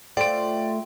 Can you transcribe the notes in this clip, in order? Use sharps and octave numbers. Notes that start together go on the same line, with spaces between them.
A3 F4 C5 D5 G5 C6 D7